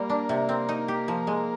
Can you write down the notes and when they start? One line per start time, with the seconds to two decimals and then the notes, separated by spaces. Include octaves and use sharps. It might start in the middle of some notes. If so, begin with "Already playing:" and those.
Already playing: G3 A#3
0.10 D4
0.29 C3
0.49 C4
0.69 D#4
0.88 G4
1.08 F3
1.27 G#3